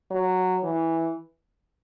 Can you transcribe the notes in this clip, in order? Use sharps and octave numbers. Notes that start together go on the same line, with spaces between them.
F#3
E3